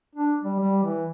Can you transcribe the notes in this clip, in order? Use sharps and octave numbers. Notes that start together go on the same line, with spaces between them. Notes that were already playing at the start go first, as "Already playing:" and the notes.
D4
G3
G3
E3